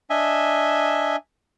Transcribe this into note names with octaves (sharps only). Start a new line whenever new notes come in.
D4 D#5 E5 G#5